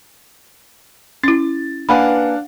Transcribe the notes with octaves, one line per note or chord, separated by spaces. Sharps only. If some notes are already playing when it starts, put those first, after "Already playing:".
C#4 E4 A6
A#3 D4 B4 F5 F#5 G#5 B5